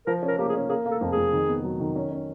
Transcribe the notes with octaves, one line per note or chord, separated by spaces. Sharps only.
F3 A#4
C#4
A#4
A#3 G4
G#4
C#4
A#3 G#4
A#3
A4
F2
G#4
F2
D#3
B3
F#3
D#3
C#4
C#4